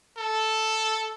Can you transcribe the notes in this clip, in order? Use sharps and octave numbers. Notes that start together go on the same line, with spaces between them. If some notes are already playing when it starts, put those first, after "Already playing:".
A4